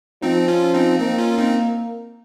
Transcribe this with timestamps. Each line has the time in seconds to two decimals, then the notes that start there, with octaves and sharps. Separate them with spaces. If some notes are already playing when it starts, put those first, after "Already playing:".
0.22 F3 C4 D#4
0.48 C#4 F4
0.74 C4 D#4
0.99 A#3 C4 D#4
1.18 C#4 F4
1.38 C4 D#4